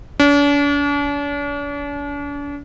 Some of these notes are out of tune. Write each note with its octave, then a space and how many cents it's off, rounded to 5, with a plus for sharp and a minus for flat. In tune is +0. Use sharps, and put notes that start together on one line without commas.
D4 -45